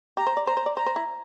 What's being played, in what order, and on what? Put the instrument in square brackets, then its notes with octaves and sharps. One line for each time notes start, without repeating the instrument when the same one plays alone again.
[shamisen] G4 [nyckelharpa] A#5
[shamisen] C5
D5
[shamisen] C5 [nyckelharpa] A#5
[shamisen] C5
D5
[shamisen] C5 [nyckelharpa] A#5
[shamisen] C5
E4